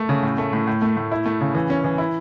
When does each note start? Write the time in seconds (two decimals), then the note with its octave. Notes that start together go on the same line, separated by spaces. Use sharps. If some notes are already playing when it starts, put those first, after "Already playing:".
Already playing: A3
0.09 C#3
0.23 A2
0.38 A3
0.53 A2
0.67 A2
0.82 A3
0.97 A2
1.12 E4
1.26 A3
1.41 C#3
1.55 E3
1.70 C#4
1.84 E3
1.98 E4